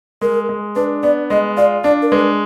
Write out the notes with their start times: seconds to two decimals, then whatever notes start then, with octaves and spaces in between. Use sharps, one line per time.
0.21 G#3 A#4
0.49 G#3
0.76 D4 B4
1.03 B3 D5
1.30 G#3 D#5
1.57 F4 D5
1.84 D4 D5
2.02 A#4
2.12 G#3 B4